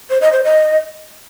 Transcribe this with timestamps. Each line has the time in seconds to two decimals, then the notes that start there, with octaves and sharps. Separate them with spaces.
0.10 C5
0.21 D#5
0.33 C5
0.44 D#5